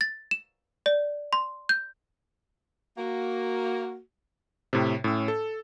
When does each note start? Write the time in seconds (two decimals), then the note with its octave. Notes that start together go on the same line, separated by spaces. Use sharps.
0.01 A6
0.31 E7
0.86 D5
1.33 C6
1.69 G6
2.97 A#3 F#4
4.73 A2 C3
5.04 A2 C#4 E6
5.28 A4